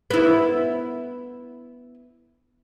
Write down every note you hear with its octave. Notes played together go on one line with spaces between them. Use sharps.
B3 E4